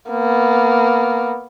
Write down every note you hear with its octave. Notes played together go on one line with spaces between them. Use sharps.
A#3 B3